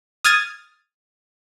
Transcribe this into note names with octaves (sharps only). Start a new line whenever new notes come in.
D#6 F6 G#6 A6 D#7